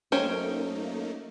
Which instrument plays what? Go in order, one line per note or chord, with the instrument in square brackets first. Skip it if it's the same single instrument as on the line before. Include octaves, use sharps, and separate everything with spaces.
[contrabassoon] F#2 [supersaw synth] A3 A#3 D#4 [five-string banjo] C#4 C5 G5